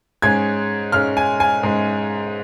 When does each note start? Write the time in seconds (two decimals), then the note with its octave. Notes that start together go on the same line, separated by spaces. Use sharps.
0.22 G#2 G#3 C#4 G#6
0.92 G#2 G#3 C#4 F6
1.17 G#5
1.40 G#5
1.63 G#2 G#3 C#4